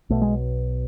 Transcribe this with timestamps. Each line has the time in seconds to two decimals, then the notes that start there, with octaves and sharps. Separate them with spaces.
0.10 B1 B2 A3
0.22 G#3